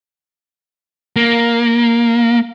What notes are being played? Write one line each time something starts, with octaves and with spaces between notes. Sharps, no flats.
A#3